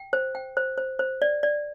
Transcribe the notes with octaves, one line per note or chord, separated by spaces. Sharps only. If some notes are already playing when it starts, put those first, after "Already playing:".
Already playing: G5
C5
G5
C5
C5
C5
D5
D5